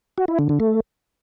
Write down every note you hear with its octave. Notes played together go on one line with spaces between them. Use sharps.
F#4
E4
D3
D3
A3